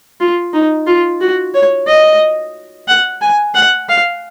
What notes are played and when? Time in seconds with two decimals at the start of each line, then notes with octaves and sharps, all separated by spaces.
0.20 F4
0.53 D#4
0.87 F4
1.21 F#4
1.54 C#5
1.87 D#5
2.88 F#5
3.22 G#5
3.55 F#5
3.89 F5